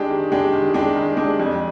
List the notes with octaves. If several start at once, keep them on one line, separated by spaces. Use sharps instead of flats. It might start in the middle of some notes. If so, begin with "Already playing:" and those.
Already playing: G#3 D4 G4
D#3
G#3 D4 G4
D#3
G#3 D4 G4
D#3
G#3 D4 G4
F2